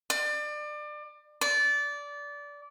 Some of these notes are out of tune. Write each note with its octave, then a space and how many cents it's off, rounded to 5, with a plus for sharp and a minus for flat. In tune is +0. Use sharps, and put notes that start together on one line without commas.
D5 +30
D5 -20